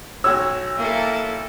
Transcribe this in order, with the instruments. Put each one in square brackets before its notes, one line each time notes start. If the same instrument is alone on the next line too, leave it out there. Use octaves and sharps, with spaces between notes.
[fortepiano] B1 F#4 C#5 [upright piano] E6
[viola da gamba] A#3 E4 A4